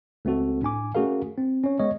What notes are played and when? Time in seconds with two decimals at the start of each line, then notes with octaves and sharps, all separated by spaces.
0.25 C#2 A3 C4 F#4 A4
0.62 A2 D4 G#5 D6
0.95 A3 C#4 F#4 G#4 A#4 F5
1.37 C4
1.63 C#4 C#5
1.79 G#3 B3 C#5 D#5